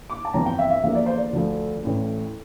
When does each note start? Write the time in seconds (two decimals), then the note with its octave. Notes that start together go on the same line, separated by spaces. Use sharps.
0.10 D6
0.25 A5
0.34 G1 F2 E3 A#5
0.46 G5
0.59 E5
0.71 E5
0.83 E2 D3 F3 A#3 E5
0.95 D5
1.06 C5
1.17 D5
1.33 D2 D3 F3 A3
1.83 A1 A2 E3 A3